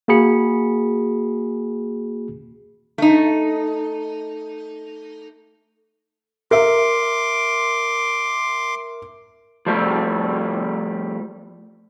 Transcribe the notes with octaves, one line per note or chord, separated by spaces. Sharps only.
A#3 F#4 G#4 B5 C#7
A3 D#4
A#4 E5 C6 D6
F3 G3 A3